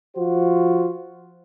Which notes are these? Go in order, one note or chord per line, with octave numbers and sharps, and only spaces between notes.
F3 F4 F#4 C5